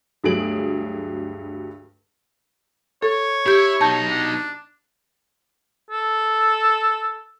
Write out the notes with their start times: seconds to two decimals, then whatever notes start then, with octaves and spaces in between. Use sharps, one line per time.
0.24 D2 G2 F#3 G#4 D7 F#7
3.03 A4 C#5
3.46 E4 G4 G6
3.81 B2 D#4 A5 G6
4.09 D4
5.91 A4